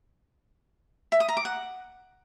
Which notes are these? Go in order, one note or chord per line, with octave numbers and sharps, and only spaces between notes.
E5
D#6
A#5
D6
F#5